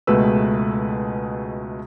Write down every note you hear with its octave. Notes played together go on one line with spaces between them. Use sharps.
C#2 B2 G#3 A3 B4 E6